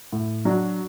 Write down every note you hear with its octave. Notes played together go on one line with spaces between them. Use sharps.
A2
F#3 D4 F#4